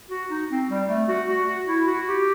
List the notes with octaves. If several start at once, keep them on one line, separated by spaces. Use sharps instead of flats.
F#4
D#4
C4
G3
A3
F#4
F#4
F#4
E4
F#4
G4